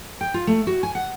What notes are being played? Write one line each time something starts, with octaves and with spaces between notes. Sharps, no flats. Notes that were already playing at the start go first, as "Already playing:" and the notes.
G5
F4
A3
F#4
G#5
F#5